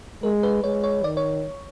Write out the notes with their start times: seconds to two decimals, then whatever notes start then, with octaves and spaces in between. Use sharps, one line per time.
0.23 G#3 A#4
0.43 B4
0.64 G#3 C#5
0.84 C#5
1.04 D#3 D5
1.17 C#5